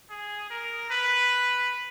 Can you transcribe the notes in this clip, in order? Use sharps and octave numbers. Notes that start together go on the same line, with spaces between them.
G#4
A#4
B4